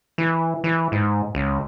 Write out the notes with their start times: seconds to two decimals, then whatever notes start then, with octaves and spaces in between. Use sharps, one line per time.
0.18 E3
0.64 E3
0.92 G#2
1.35 C#2